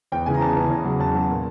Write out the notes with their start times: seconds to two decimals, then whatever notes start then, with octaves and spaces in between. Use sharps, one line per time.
0.12 E2 G5
0.26 C#3 E3 G#5
0.34 A#5
0.41 E2 A5
0.56 C#3 E3
0.70 E2
0.85 C#3 F#3
0.99 E2 A5
1.14 C#3 F#3
1.29 A#2